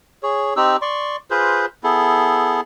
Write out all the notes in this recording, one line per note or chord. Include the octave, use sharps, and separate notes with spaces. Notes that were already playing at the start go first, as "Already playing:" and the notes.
G#4 C#5
C4 D#4 G4 E6
D5 C6 C#6
F4 G#4 B4 C5
B3 E4 G#4 A4